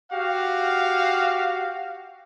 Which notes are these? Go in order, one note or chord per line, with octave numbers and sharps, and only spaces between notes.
F#4 G4 F5